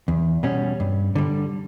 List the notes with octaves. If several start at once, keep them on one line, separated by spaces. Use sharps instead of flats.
E2
B2 G3 C#4
G2
D3 G3